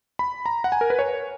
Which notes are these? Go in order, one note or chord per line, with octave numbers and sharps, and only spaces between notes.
B5
A#5
F#5
G#5
A#4
B4
C#5